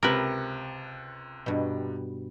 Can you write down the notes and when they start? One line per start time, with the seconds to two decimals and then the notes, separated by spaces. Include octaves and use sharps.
0.03 C#2 C3 A#4 B4
1.46 G2 B2